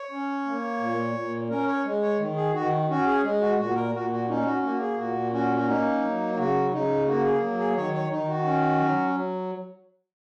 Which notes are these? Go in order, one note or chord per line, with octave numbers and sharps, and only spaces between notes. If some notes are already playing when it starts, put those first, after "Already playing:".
Already playing: C#5
C#4
A#3
A#2
A#2
C#4 A#4
C#5
G#3
C#5
D#3
G#4
D#3 F#4
C#4 F#4
G#4
G#3
F#4
A#2 F#4
A#4
A#2 F#4
F#4
C#4 D#4
F#4
A#3 F#4
G#4
A#2 F#4
C#4 F#4
F#4
A#3 D#4
F#3
C#3 F#4
C#3 D#4
A#3 F#4
G#4
F#3
G#4
D#3 C#5
C#5
D#3 D#4
F#4
C#4
F#3